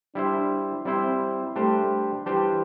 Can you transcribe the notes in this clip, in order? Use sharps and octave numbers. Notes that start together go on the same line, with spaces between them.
G3 D4 E4 C5
G3 C4 E4 C5
G3 A3 D4 G4 C5
E3 G3 D4 G4 C5